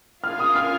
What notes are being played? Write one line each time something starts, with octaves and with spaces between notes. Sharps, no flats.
C#4 F4 A#4 F5 G#5 F6
D#6
F6